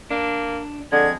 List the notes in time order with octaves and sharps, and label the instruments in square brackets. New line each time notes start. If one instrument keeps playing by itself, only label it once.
[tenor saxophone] A#3 [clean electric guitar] D4
[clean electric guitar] F2 [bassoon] D3 [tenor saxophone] G#3 [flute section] G#6